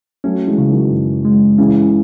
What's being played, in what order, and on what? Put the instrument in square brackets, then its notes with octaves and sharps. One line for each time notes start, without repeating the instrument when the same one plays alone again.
[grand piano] F#3 A3 [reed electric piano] C#4
[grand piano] E3 G#3
[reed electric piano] C#3
[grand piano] D#3 F#3
[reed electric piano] F#2
G#3
[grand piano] C#3 E3 [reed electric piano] C#4